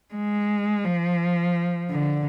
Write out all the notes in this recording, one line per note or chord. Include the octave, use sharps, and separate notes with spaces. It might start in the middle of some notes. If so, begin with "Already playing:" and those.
G#3
F3
D3